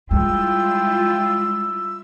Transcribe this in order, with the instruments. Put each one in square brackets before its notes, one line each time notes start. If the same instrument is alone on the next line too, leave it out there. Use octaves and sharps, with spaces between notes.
[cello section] G3 E4 F4 [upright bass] G#3 [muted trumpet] G5 [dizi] E6